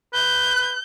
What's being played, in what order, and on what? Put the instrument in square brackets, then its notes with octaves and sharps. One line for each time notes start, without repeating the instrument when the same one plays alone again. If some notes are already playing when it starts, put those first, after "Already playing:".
[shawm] B4 [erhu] G6